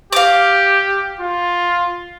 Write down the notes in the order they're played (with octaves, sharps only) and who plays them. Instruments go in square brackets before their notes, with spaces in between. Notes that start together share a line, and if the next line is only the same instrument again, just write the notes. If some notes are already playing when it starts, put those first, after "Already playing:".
[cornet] G4 [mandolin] F5 D6
[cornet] F4